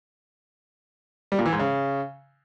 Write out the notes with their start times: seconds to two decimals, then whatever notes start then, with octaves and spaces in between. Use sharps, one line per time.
1.32 G3
1.39 A#2
1.46 E3
1.52 G#2
1.59 C#3